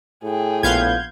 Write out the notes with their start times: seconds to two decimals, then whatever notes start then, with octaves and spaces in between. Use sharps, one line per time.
0.23 A2 G#4 G5
0.63 A#1 B3 F4 F5 G6 G#6